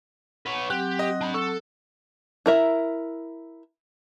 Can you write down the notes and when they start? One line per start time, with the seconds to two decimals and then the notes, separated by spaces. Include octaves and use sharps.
0.46 B4 C#5 F#5
0.70 F#3 C4 G4 F#5 F#6
0.99 D#5
1.21 D4 B5
1.34 A4 C#6
2.46 E4 A#4 E5